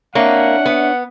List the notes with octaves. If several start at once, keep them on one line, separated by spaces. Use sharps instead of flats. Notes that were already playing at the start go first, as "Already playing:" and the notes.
A#3 D4 C#5 E5 F#5
B3